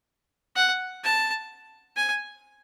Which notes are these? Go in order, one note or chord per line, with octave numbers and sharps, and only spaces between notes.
F#5
A5
G#5